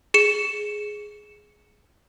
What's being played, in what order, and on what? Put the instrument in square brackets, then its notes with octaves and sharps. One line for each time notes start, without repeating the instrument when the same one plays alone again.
[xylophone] G#4 C#7 E7